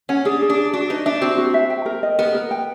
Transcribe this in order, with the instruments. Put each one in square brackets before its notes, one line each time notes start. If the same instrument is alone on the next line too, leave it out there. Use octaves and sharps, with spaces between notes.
[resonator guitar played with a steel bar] C#4 [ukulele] F#5
[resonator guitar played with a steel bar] D4 [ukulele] G#4
[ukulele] G#4
[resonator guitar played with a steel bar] D4
[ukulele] G#4
[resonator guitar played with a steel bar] D4 [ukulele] F#4
[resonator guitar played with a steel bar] D#4 [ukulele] B4
[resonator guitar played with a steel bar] D4 [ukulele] E5
[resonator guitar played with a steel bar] C4 [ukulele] F#4
[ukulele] F#4
E5
G5
A#4
D#5
[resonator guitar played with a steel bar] B3 [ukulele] A#4
[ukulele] A#4
G5